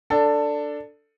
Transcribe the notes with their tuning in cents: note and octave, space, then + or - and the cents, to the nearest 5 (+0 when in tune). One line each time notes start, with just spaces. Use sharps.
D4 +0 A4 +15